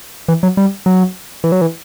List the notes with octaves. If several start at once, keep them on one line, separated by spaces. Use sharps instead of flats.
E3
F#3
G3
F#3
E3
F#3
E3